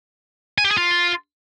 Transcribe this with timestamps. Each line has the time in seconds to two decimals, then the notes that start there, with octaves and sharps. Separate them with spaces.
0.58 G#5
0.65 G4
0.71 G#4
0.77 F4